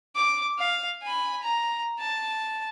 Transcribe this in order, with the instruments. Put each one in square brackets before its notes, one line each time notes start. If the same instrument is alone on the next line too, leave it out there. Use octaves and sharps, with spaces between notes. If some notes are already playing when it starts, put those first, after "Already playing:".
[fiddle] D6
F5
G#5 B5
A#5
A5